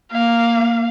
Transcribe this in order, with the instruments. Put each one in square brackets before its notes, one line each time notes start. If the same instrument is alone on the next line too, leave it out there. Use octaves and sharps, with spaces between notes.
[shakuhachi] A#3 [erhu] F5